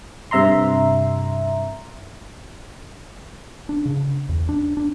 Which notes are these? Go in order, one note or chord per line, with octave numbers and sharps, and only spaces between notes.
G2 C3 E5 A#5 C6
D4
C#3
E2
D4
D4